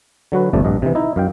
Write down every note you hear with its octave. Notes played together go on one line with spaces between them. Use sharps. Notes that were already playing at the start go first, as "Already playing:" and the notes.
D3 F#3 F#4 B4
G1 F2 C3 A3 D5
A#1 G2 D#5
C3 E3
D#4 E4 D#5
F#2 F5 G5